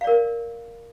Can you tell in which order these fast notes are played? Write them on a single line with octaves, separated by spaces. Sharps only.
F5 D5 A#4